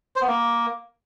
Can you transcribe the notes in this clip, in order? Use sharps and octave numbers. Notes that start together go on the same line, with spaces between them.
C5
B3
A#3